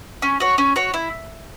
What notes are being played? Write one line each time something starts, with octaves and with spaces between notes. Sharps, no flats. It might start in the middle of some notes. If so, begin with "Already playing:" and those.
C#4
F#4 C#5
C#4
F#4 C#5
E4